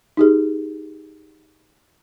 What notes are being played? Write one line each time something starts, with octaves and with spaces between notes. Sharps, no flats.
D#4 G4 G#4